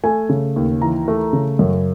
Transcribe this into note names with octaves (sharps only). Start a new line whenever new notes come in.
A3 G#5
C#3
D#2
E3 A#5
A3
C#3
F#2